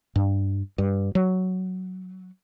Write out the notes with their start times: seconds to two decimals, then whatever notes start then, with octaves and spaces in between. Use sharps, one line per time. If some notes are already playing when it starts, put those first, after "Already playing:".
0.16 G2
0.78 G2
1.15 F#3